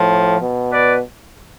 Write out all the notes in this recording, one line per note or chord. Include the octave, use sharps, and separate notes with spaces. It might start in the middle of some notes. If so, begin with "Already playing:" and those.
Already playing: A2 F3
B2
B4 D5